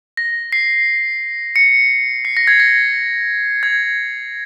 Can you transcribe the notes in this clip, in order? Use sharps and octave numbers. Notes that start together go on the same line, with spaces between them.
A#6
C7
C#7
C7
A#6
G#6
A#6
G#6